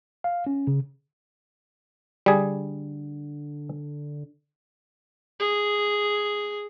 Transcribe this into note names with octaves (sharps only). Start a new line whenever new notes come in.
F5
C#4
C#3
D3 G3 G#4
G#4